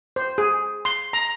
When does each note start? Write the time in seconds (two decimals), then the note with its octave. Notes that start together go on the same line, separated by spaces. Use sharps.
0.16 C5
0.38 G#4
0.85 C6
1.13 A#5